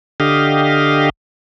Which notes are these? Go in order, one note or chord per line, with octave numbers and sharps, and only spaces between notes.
D3 G4 D#5 F5